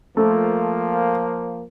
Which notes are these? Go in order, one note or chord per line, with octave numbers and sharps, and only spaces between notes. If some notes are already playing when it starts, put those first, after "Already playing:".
F3 A3 A#3